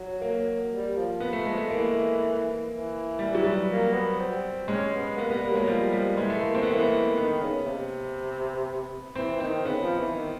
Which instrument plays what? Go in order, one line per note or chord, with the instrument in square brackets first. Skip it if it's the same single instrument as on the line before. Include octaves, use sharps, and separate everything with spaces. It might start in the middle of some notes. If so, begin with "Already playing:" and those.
Already playing: [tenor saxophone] F#3
[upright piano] A#3
[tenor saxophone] G3
F3
[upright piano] B3
A3
G#3
A3
[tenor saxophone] E3 [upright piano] A#3
[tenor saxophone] E3
[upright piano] G3
F#3
G3
[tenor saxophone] A#3
B3
C4
[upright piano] G#3 [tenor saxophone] C#4
[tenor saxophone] B3
[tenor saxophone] A#3 [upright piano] B3
[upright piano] B3
[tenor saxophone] G3
[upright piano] A#3
[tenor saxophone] F#3 [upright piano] G#3
[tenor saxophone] F3 [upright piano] G3
[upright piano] G3
[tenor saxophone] E3 [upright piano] G#3
[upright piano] A3
A#3
C4
B3
[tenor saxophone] E3 [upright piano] A#3
[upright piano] B3
[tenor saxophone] D#3 [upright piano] B3
[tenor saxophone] C#3
C3
[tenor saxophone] E3 [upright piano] C4
[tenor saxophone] E3
[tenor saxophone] D#3 [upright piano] C4
[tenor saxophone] C#3 [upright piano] B3
[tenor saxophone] F3
E3
D#3